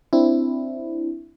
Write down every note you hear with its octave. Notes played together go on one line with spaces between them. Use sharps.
C4 D4 E4